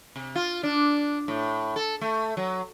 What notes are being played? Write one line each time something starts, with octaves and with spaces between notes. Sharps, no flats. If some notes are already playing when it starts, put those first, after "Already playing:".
C3
F4
D4
A2
A4
A3
F#3